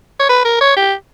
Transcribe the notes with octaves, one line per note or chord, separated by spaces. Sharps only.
C#5
B4
A#4
C#5
G4